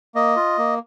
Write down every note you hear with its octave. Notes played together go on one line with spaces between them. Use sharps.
A#3 D#5
F4
A#3